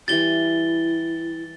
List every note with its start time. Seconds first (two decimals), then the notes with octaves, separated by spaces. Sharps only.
0.08 E3 G3 E4 G4 A6 G7